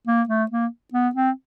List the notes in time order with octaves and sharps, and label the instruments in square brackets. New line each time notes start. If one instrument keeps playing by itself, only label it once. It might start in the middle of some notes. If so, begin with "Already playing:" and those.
[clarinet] A#3
A3
A#3
B3
C4